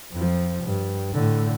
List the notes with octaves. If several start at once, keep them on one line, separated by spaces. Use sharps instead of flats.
F2 F3
G2
A2 D3